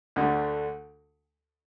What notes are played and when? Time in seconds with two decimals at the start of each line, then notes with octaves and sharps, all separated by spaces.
0.16 D2 D3 A3